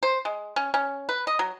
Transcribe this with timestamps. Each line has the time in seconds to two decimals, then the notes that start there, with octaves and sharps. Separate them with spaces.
0.03 C5
0.25 G#3
0.56 C#4
0.74 C#4
1.09 B4
1.27 D#5
1.39 F#3